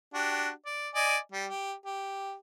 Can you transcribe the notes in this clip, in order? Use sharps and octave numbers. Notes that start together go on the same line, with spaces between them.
D4 F#4 G4
D5
D5 D#5 G#5
G3
G4
G4